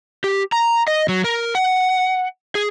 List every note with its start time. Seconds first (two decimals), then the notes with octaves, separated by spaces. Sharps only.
0.24 G4
0.52 A#5
0.88 D#5
1.09 F#3
1.24 A#4
1.55 F#5
2.55 G#4